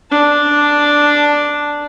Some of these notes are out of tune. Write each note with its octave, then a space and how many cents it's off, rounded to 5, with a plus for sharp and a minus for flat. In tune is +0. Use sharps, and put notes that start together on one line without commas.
D4 +0 A5 +0